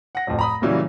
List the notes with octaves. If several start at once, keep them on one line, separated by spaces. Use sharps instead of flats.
F#5 A#6
D1 F2
A#5 B5 D#6
A#2 C#3 E3 F#3 G3